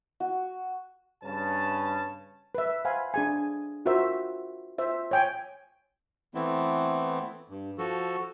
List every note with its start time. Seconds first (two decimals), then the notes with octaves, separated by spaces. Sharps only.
0.20 F#4
1.24 G2 C#3 C#4 B4 A5
2.55 B4 E5
2.85 C5 F5 F#5 G#5 B5
3.14 D4 G#4 G#5
3.86 F4 F#4 A#4 C5 E5
4.78 F4 C5 E5
5.11 C#5 G5 G#5
6.35 E3 A3 B3 C4 E4
7.49 G2
7.78 F3 F#4 A4